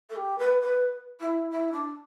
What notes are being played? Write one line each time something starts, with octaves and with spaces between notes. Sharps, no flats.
A4
G4
B4
B4
E4
E4
D4